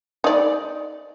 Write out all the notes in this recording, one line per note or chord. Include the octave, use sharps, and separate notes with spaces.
D#4 D5